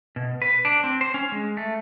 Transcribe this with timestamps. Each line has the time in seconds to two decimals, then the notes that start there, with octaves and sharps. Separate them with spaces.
0.16 B2
0.42 B4
0.65 D4
0.84 C4
1.01 C5
1.14 C#4
1.32 G#3
1.57 A3